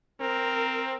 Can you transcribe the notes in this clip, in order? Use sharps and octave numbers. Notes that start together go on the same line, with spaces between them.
C4 A#4